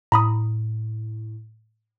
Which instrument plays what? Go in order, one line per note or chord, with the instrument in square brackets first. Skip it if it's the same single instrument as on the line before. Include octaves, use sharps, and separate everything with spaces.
[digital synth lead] A2 [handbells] A#5 B5 D#6